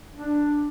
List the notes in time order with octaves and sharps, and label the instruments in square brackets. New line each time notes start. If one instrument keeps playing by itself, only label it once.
[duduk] D4